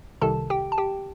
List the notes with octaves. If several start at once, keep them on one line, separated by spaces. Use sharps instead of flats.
C2 C3 D#3 A4 A5
G4 G5
A5
G4 G5